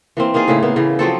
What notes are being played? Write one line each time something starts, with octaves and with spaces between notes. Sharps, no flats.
E3 A#3 C4
A#3 D#4 F4 G#4
A2 C#3 A#3 E4
A#3 B3
C#3 E3 B3
F3 F#3 C4 A4